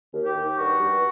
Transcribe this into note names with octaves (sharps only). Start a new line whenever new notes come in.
D#2
G4
D#2
G2 F#4
G2